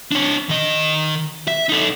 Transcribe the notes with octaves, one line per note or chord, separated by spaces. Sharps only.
D4 C#5
D#3 D#5
E5
D#4 A4